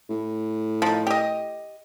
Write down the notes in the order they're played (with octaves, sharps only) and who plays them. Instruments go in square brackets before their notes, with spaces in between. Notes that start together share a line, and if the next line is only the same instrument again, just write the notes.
[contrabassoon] A2
[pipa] F3 D#4
G4 D#5